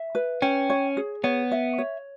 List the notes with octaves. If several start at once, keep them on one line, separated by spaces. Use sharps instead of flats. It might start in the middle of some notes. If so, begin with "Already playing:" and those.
Already playing: E5
B4
C#4 G5
C#5
G#4
B3 C#5
E5
C#5